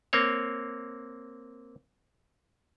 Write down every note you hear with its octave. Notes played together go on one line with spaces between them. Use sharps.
A#3 C4 C#5